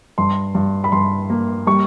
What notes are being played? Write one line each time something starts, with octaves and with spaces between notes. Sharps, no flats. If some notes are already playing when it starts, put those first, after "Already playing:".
G2 C6
G2
B5
G2 C6
A#3
G3 C#6